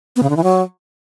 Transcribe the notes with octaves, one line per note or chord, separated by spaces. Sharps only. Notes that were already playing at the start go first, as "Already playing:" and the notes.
B3
C#3
D3
E3
F#3